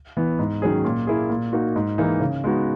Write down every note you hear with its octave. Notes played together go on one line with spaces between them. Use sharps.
E3 B3
G#2
D#3 F#3 C#4 G#4
A#2
A#3 E4 G#4
A#2
A#3 D#4 F#4
G#2
E3 A#3 D#4 G#4
C#3
G#3 B3 D#4 F#4